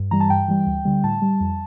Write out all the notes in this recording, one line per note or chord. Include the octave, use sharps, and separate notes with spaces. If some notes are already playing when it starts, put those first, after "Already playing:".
Already playing: G2
E3 G3 A#5
A5
G2 G5
E3 G3
D2
D3 G3
A2 A5
G3
F2